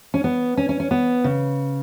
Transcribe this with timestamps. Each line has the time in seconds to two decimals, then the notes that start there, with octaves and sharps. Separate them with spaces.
0.14 C#4
0.24 B3
0.57 C#4
0.69 C#4
0.80 C#4
0.91 B3
1.24 C#3